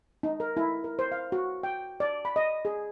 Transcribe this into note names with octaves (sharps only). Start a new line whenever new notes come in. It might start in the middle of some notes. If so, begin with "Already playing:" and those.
D#4
A#4
E4
A#4
C5
F5
F#4
G5
D5
B5
D#5
G#4